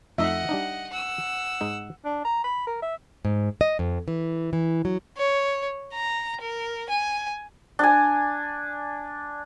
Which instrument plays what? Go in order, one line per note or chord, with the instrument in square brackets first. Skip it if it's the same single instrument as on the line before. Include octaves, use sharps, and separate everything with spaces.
[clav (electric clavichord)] F2 A3 D#4 [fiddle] D#5 F#5 [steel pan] E5
[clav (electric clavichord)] G3 D4 D#4
[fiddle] F#5 E6
[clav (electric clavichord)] G#2 G#3 D#4
[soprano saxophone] D4
A#5
B5
A#4
E5
[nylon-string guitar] G#2
D#5
F2
E3
E3
F#3
[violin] C#5
A#5
A#4
G#5
[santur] D4 G#5